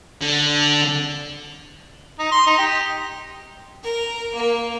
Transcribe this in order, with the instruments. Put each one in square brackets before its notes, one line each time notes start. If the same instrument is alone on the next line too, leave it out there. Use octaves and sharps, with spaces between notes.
[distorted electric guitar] D3
[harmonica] D#4
C6
D#4
G4
[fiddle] A#4
A#3